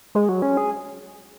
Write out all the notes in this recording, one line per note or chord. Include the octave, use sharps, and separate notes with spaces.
G#3
F#3
C#4
G#4